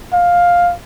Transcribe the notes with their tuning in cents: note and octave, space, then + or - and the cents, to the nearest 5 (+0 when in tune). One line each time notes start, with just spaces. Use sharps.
F5 +10